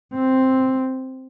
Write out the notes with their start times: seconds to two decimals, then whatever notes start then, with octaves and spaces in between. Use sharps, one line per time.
0.14 C4